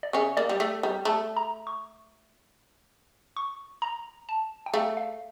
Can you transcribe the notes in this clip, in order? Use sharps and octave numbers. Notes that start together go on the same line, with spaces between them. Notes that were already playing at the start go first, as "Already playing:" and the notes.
D5
C#3 C#4 E5
A#3 D5
G3
A3 E5
G3
A3 A5
A#5
C#6
C#6
A#5
A5
G5
A3 F5
F5